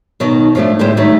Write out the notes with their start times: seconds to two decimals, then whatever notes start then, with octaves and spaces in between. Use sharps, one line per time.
0.20 B2 D#3 F#3 D#4 F#4
0.55 F3 F#3 G#3 A3 D4
0.79 A2 D3 G#3 G4 C5
0.97 D#3 F#3 G3 A3 A4